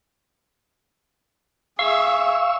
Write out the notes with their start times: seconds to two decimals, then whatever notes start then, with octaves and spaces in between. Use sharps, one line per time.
1.79 G#4 E5 F5 C#6 E6